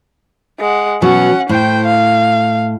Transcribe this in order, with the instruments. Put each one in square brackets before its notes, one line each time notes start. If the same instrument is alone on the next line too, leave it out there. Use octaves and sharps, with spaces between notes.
[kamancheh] G#3 F#5
[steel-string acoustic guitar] B2 F#3 [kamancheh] C#4 F#5
[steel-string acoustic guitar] A2 [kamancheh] C5 G5
[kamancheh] F5